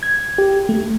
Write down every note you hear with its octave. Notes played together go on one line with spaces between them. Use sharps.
G#6
G4
A3